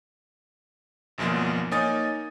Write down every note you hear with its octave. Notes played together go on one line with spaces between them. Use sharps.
G#1 F#2 B2 F3 A#3
A#3 D#4 C#5 G#5 D#6 A6